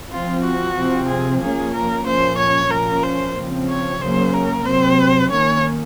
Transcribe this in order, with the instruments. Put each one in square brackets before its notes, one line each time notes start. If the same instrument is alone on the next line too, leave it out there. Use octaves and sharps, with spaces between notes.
[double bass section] F3 C4 [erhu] F4
[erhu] F#4
[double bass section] C3 F3 C4
[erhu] G#4
[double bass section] F3 A#3 C#4 [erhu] G#4
[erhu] A#4
[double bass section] A#2 F3 A#3 C#4 [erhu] C5
[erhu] C#5
[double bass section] A#2 F3 A#3 C#4 [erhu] A#4
[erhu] C5
[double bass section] C#3 F3 C4
[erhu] C#5
[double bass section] C#3 F#3 A#3 C#4 [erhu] C5
[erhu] A#4
[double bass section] C3 F#3 C4 [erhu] C5
[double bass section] D#3 A#3 C#4 [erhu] C#5